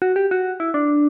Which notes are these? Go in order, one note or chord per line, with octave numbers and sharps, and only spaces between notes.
F#4
G4
F#4
E4
D4